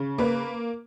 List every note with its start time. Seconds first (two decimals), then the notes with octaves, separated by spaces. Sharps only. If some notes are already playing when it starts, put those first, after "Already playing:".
Already playing: C#3
0.18 A#3 B4